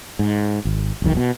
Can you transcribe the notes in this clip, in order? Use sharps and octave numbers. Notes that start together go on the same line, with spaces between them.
G#2
G#1
E1 B1 D#3
B2